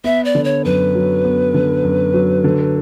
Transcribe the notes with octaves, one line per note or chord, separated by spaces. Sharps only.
B3 E5
D5
D3
C#5
F#2 B4
F#3
B3
D3
F#2
F#3
D3